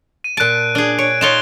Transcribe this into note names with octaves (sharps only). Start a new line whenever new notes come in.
D#7
A#2 A5 F#6 D7
D4 G#4
C#5 D7
D#4 F4 C#5 E7 F7 G7